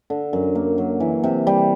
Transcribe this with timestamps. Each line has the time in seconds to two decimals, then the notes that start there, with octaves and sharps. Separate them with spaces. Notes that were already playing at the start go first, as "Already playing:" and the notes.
0.10 D3
0.33 F#2
0.55 A#3
0.78 F#3
1.00 E3
1.24 C3
1.47 G3